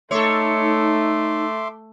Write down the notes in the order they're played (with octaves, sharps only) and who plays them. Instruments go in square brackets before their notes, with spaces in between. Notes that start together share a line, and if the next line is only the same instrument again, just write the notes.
[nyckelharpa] A3 [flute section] D#4 [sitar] A4 C#5 [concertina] E5 C6 D6